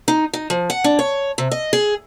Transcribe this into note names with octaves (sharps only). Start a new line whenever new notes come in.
D#4
D#4
F3
F#5
D4
C#5
C3
D#5
G#4